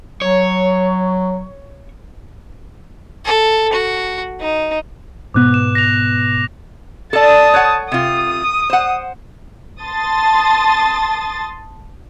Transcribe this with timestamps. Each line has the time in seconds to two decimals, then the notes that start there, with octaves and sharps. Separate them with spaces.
0.22 F#3 C#5
3.25 A4
3.73 F#4
4.40 D#4
5.34 G#2 B2 B3 D6 F#6
5.54 E7
5.75 A#6 F7
7.13 A4 D5 A5 D#6
7.54 C#5 F#5
7.92 C3 F4 D#6
8.70 C5 F#5
9.82 A5 C6 D#6 A6